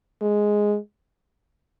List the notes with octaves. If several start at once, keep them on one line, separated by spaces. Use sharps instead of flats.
G#3